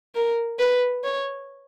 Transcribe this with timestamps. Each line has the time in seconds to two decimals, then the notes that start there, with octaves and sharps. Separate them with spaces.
0.15 A#4
0.59 B4
1.04 C#5